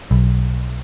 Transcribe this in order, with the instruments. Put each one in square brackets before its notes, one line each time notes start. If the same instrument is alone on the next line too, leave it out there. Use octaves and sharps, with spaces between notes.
[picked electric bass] B1